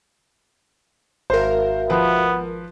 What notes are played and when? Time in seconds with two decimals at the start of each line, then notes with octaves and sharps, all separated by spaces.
1.30 G#1 F#4 A#4 C5 E5 F5
1.90 F3 B3 B4